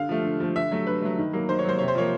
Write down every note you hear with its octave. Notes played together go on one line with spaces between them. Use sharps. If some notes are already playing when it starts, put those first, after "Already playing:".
Already playing: D3 F5
F3 A3
D3
F3 A3
D3 E5
F#3 A3
D3 B4
F#3 A3
D#3
F#3 A#3
D#3 C5
C#5
F#3 A#3 C5
C3 C#5
C5
F3 A#3 C#5